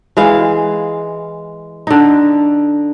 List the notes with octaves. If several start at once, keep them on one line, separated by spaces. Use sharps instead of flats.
E3 G#3 F5
D3 D#4